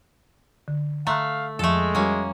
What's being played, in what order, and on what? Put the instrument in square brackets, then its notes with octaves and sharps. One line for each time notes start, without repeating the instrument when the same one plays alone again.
[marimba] D3
[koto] A3 [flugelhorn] F5 [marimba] A#5 C6 F#6
[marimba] F2 F3 [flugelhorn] G#3 [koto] A3 A4
[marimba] G3 F#4 [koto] A#3 C#4